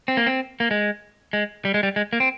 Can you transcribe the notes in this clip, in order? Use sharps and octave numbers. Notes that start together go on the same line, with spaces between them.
C4
A#3
C4
A#3
G#3
G#3
G3
G#3
G3
G#3
A#3
C4